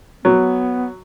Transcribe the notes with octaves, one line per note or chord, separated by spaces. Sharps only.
F#3 B3